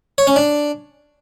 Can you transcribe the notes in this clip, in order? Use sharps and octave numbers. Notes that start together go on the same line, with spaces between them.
C#5
C#4
D4